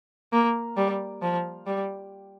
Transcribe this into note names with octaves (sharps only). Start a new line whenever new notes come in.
A#3
G3
F3
G3